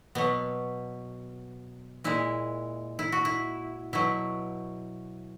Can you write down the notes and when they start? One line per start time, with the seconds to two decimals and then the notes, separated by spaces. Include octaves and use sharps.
0.15 B2 F#3 B3
2.04 A#2 G#3 E4
2.99 E4
3.12 F#4
3.25 E4
3.93 B2 F#3 E4